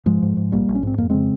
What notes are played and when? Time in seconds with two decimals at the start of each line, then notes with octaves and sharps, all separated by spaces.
0.06 G#2 F3 G#3
0.22 G#2
0.37 G#2
0.52 A#1 G3 A#3
0.69 A#1
0.75 C#4
0.83 G#2 C4
0.98 F2 A#3
1.10 C#3 G#3 C4